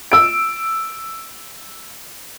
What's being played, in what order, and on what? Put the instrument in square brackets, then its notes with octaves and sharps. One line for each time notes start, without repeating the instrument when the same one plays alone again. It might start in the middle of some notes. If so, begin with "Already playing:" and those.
[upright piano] E6 D7